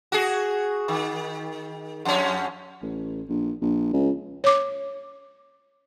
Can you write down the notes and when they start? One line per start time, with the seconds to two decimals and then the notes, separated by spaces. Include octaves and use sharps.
0.12 F#4 G#4
0.88 D#3
2.05 F2 C#4
2.82 A1
3.29 A#1
3.61 A#1
3.93 C#2
4.44 C#5 D6